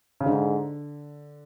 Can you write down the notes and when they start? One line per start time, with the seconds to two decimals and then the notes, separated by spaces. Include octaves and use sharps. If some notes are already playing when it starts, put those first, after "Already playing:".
0.21 C#3
0.26 G#2 D3